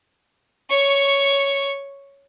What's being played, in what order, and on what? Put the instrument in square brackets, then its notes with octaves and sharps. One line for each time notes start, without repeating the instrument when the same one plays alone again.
[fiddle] C#5 C#6